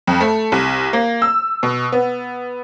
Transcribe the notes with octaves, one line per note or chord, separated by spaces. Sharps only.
F2
A3
C2
A#3
E6
B2
B3